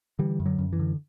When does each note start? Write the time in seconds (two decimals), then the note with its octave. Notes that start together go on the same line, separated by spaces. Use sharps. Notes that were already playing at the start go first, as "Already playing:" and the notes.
0.19 D3 E3 G3
0.40 F#2
0.46 D3 F#3
0.59 F#2
0.73 E3
0.79 D3